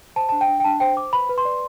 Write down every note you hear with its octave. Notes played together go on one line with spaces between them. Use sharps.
C5 A5
D4 A5
G5
D4
G5
D4 A5
C5 G5
C5 D6
B4 B5
B4
C6
D5